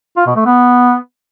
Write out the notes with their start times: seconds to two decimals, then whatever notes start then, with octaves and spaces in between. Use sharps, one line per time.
0.17 F4
0.27 B2
0.36 A3
0.46 B3